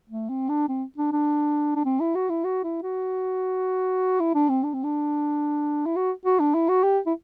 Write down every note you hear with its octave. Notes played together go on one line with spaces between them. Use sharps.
A3
C4
D4
C4
D4
D4
D4
C4
E4
F#4
E4
F#4
E4
F#4
E4
D4
C4
D4
C4
D4
E4
F#4
F#4
D4
E4
F#4
G4
E4